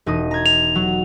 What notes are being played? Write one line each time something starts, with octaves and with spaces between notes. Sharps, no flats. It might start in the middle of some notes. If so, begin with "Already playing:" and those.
E1 D#4 D#6
A#5 G#6
F7
F#3